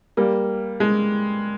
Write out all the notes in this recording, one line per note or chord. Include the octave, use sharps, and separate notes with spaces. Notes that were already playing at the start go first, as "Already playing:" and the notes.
G3 A#3
G#3